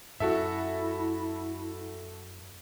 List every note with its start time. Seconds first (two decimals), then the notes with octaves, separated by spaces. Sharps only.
0.20 F#2 E4 F#4 A4 E5